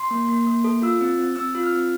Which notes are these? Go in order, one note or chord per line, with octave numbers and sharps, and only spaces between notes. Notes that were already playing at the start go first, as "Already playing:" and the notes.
Already playing: C6
A#3
A#3
A#3
A4
F4 E6
C4
C4
C4 E6
F4
F6
C4